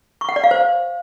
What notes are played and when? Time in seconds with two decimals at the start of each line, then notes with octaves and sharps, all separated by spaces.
0.21 C#6
0.29 F#5
0.36 D5
0.44 F5
0.51 C5